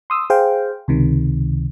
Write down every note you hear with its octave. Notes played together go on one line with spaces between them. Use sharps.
C6 D#6 E6
G#4 C5 F5 G5
C#2 C3 D#3